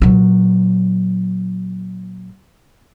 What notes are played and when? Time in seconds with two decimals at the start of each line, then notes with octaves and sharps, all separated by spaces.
0.02 A#2 F#3